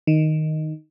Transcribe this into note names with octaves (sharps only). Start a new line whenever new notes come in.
D#3